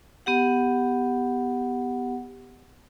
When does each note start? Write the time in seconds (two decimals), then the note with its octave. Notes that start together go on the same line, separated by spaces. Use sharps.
0.26 B3 G4 F#5